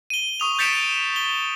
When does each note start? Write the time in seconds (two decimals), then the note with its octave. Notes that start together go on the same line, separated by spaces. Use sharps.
0.10 D#7 G7
0.40 C#6 D#6 F7
0.59 G6 A6 B6 C#7 D7 E7
1.16 G7